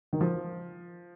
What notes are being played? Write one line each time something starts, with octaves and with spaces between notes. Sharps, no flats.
D#3
F3